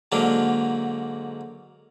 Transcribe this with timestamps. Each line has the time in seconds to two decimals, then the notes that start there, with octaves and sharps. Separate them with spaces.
0.12 G#2 D3 F#3 A#3 D4